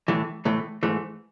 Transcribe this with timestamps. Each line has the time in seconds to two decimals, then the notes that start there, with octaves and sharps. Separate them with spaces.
0.08 A2 E3 A3
0.45 A2 E3 A3
0.83 G#2 E3 A3